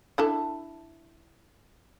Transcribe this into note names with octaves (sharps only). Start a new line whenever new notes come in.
D4 E4 A4